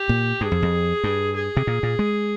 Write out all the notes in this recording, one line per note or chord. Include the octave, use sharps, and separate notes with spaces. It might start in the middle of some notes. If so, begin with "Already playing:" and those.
Already playing: G4
A#2
G2 G#4
F2
F2
G2
G#4
C3
A#2
A#2
G#3